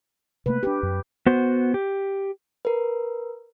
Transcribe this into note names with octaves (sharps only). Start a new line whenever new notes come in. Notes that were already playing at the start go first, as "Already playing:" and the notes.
C3 A3 A#3 B4
B3 D4 G4 B4
F#2
B3 F#4 C5
G4
A#4 B4